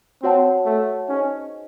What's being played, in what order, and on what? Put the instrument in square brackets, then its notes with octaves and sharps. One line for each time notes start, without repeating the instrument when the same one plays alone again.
[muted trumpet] C4 [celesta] F#4 C#5 F#5 A5
[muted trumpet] A3
[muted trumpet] C#4 [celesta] D#4 G#4 C5 D#5